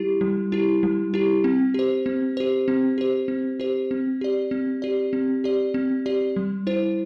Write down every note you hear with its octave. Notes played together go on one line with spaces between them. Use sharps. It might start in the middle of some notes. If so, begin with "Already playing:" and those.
Already playing: G3 E4 G4
G3
E4 G4
G3
E4 G4
C4
G4 C5
C4
G4 C5
C4
G4 C5
C4
G4 C5
C4
G4 D5
C4
G4 D5
C4
G4 D5
C4
G4 D5
G3
E4 C5